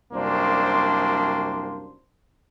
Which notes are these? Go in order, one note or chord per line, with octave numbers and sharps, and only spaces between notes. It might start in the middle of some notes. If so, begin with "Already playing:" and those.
C2 F#2 A#3 D4 C5